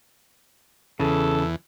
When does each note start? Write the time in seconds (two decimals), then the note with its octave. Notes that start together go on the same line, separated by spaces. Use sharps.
1.00 E2 C#3 A4